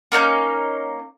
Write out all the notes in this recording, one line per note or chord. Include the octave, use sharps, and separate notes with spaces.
A#3 C#4 D#4 G6